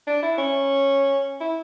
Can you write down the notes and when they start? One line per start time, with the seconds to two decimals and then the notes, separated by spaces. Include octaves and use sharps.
0.07 D4
0.23 E4
0.38 C#4
1.41 E4